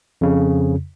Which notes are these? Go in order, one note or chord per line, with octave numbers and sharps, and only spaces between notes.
F2 C#3